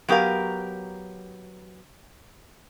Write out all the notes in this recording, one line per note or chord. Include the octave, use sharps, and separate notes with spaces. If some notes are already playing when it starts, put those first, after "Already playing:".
F#3 B3 G4 A#4 F5